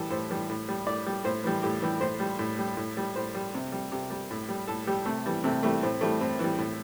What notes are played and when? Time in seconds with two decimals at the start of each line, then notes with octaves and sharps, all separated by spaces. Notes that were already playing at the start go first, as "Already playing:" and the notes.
Already playing: A2 E3 G3 G4 A4
0.10 A2 C5
0.30 E3 G3
0.49 A2
0.69 G3
0.86 A2 D5
1.06 G3
1.24 A2 C5
1.44 E3 G3
1.63 A2 G4
1.82 E3 G3
2.01 A2 C5
2.20 G3
2.39 A2
2.59 G3
2.77 A2
2.97 G3
3.16 A2 C5
3.35 G3
3.54 C3
3.72 G3
3.92 C3 G4
4.10 G3
4.31 A2
4.49 G3
4.67 A2 A4
4.87 G3 G4
5.06 C3 A3
5.26 E3 G3
5.44 C3 A3
5.63 E3 G3 A3
5.83 A2 C4
6.01 E3 G3 A3
6.21 A2 C4
6.39 E3 G3
6.58 A2